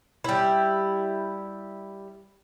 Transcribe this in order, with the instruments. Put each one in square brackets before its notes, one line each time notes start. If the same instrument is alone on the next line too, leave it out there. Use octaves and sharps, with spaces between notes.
[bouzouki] G3 E4